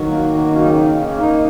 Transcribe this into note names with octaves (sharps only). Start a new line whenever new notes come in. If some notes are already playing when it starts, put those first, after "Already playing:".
Already playing: D#3 F#3 F#4
A#3
D#3
C#4
C#3 D#4
D#4
A#3
C#4
A#3
D#4